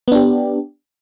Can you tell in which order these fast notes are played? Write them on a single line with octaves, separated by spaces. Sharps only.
B3 D4 G4